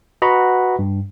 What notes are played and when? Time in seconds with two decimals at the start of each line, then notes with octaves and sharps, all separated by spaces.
0.22 F#4 B4 D#5 F#5 A#5 B5
0.79 G2